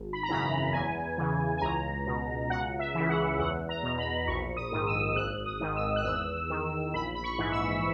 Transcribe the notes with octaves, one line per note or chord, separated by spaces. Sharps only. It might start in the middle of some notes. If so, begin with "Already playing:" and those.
Already playing: G#1
B5
A#5
F#2 C#3 E3 B5
A#5
E2 G#5
C#3 E3
G#5
C#2 A#5
B2
C#2 F#5
E5
C#3 E3
F#5
E2 F#5
A#5
B2
B5
A#1 C#6
D#6
G#2 D#3
E6
G#1 F#6
D#6
G#2 D#3
E6
F#6
E2 E6
D#3
A#1 B5
B5
C#6
G#2 E3
E6